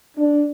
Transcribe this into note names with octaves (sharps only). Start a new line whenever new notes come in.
D4